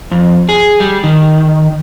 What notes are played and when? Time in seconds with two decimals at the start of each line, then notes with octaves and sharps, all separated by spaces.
0.11 F2
0.49 G#4
0.80 G3
1.04 D#3